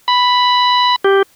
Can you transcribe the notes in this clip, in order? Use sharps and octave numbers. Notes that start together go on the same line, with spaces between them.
B5
G4